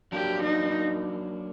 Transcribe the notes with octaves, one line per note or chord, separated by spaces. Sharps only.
F#3 A#3 D4 G4
D#4